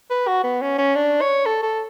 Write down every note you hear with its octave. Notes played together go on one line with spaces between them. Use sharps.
B4
F#4
B3
C#4
C#4
D4
C#5
A4
A4